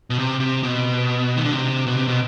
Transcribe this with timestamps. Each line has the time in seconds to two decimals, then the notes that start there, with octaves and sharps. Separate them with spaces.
0.10 B2
0.19 C3
0.40 C3
0.63 B2
1.37 D#3
1.44 D3
1.53 C3
1.87 B2
1.97 C3
2.08 B2